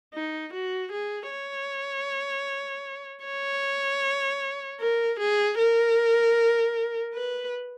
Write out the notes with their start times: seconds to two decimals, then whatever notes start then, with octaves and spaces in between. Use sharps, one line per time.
0.14 D#4
0.53 F#4
0.92 G#4
1.30 C#5
3.25 C#5
4.80 A#4
5.19 G#4
5.58 A#4
7.14 B4